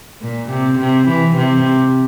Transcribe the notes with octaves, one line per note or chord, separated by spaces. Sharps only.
A#2
C3
C3
E3
C3